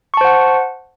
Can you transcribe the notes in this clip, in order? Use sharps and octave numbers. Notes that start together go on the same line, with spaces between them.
C5 F#5 A5 C#6